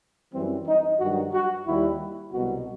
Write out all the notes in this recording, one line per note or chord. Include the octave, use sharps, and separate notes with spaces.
F#2 E3 G3 C4
D#4
G2 D#3 F#3 F#4
F#4
D#2 D#3 G3 E4
C2 B2 F#3 F#4